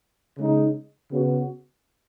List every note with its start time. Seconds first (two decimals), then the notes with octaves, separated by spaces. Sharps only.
0.37 C#3 G#3 D#4
1.11 C#3 B3 F#4